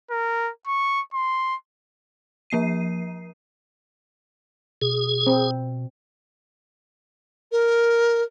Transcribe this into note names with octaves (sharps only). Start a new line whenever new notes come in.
A#4
C#6
C6
F3 A#3 C7 D#7
B2 G#4
C4
A#4